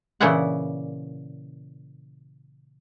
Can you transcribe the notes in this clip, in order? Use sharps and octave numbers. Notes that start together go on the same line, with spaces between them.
A#2 C#3 E3 E4 D5 F#5